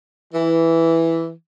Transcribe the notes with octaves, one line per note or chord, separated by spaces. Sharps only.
E3